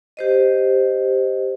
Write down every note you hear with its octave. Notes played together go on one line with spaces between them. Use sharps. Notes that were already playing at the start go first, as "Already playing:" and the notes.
G4 C5 D#5